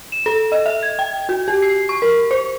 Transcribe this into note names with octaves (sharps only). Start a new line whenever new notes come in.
E7
A4
D#5
E5
G#6
G5
F#4
G4
C7
C#6
A#4
C5